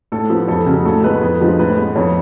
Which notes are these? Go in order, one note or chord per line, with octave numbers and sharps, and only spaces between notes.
A2 A4
F3 B3
F2 A4
C#3 F#3
A2 A4
G#3 B3 B4
F2
D3 F3 G#3
A2 B4
G#3 B3
F2 C#5